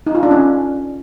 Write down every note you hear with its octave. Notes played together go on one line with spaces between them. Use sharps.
D#4
F4
D4
C#4